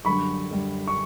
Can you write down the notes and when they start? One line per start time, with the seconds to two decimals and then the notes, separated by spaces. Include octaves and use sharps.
0.05 F#2 D3 G3 B5 C#6
0.50 F#2 D3 G3
0.88 C#6